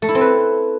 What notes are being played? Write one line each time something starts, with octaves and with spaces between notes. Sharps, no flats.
A3
E4
C4
B4